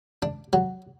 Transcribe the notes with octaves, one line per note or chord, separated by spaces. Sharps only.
D4
F#3